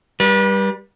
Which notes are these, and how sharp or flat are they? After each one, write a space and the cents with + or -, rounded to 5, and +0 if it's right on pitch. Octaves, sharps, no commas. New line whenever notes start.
G3 +0 B4 -35